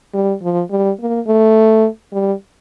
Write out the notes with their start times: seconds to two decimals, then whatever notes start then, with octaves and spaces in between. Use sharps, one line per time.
0.14 G3
0.42 F3
0.71 G3
1.00 A#3
1.27 A3
2.12 G3